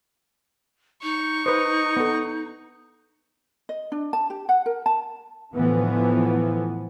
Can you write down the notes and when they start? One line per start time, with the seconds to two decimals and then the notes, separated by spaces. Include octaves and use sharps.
1.03 D#4 C#6
1.46 B4 C5 D#5
1.97 B3 A4
3.69 D#5
3.92 D4
4.13 A5
4.30 G4
4.49 F#5
4.66 A#4
4.86 A5
5.53 A2 D3 E3 F3 B3